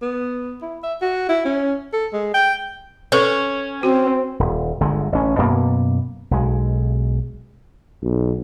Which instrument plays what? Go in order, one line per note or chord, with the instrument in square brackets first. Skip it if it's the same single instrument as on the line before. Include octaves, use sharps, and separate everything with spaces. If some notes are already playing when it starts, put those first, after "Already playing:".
[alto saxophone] B3
E4
E5
F#4
E4
C#4
A4
G#3
G5
[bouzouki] C#4 [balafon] A4 B4
[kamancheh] C4 [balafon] F#4
[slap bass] D#1
G1 D3 G#3
A1 C#4
F#2 B2 A#3 B3
B1 G#3
[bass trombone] B1